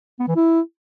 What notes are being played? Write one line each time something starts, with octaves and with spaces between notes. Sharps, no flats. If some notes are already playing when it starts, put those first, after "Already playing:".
B3
E3
E4